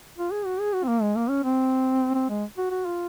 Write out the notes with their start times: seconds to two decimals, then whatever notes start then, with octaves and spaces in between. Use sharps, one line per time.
0.18 F4
0.31 G#4
0.46 F#4
0.60 G#4
0.73 F#4
0.84 C4
0.88 A#3
1.02 G#3
1.16 A#3
1.30 C#4
1.44 C4
2.15 C4
2.29 G#3
2.58 F#4
2.71 F#4
2.86 F4